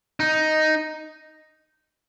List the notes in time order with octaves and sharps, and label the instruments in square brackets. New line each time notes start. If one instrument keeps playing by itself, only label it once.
[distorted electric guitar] D#4